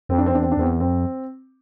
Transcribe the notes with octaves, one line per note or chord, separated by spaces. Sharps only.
F2 C4
D4
C4
E2 D4
C4
D4
E2 C4
F2 C4